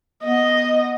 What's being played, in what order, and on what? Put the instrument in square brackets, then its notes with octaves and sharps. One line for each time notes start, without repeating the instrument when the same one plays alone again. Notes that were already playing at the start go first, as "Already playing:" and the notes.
[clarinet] B3 [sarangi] D#5